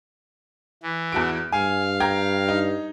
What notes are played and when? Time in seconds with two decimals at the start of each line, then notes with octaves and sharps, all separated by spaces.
0.83 E3
1.12 E2 F#4 D7
1.52 G2 F5 G#5
2.00 G5 A#5 G#6
2.48 D#4